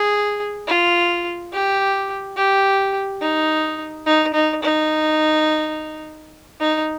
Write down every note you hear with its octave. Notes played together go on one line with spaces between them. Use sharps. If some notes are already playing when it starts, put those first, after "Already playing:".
Already playing: G#4
F4
G4
G4
D#4
D#4
D#4
D#4
D#4